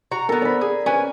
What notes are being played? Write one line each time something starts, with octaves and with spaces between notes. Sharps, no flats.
F#4 A#5
B3 A4 A#4
D5 B5
G#4
C#4 B4 G#5